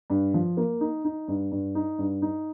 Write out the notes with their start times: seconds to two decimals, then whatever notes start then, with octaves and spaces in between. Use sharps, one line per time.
0.10 G2
0.34 F3
0.57 A#3
0.81 D#4
1.05 D#4
1.28 G2
1.52 G2
1.75 D#4
1.98 G2
2.22 D#4